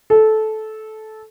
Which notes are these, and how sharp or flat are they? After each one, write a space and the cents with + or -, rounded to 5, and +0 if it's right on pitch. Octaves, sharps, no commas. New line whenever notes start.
A4 -15